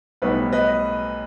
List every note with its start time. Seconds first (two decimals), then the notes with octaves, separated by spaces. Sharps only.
0.22 B1 A2 G3 B3 D#4 B4
0.52 B4 D#5